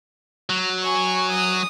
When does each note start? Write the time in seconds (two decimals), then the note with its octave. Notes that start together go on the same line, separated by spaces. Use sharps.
0.50 F#3
0.83 G#5 C#6
1.32 D#6